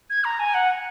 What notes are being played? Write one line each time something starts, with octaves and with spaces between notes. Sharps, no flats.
G#6
A#5
G#5
F#5